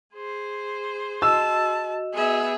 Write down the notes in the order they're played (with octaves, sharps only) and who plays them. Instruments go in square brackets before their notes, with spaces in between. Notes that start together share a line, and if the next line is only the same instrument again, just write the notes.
[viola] G#4 C5
[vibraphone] F#4 D#5 [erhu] A5 [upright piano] E6
[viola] B3 E5 [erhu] G#4